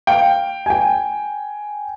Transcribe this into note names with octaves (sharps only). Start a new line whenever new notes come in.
F5 G5
G5 G#5